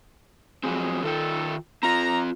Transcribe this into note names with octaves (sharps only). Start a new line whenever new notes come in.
F3 F#3 G#3 C4 G#4
D#3 F4 A4 G5
C4 F4 A#5